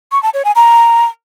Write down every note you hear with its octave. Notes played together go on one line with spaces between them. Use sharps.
C#6
A5
C#5
G#5
A#5